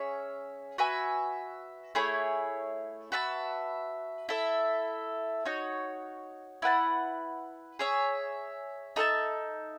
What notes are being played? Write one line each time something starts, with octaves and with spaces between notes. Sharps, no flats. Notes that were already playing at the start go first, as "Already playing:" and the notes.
Already playing: C#4 G#4 C#5 E5
F#4 B4 E5 G#5
A3 E4 G#4 C#5
F#4 B4 E5 A5
E4 A4 E5
D#4 F#4 C#5
E4 B4 F#5 A5
G#4 C#5 E5
D#4 A4 E5 A5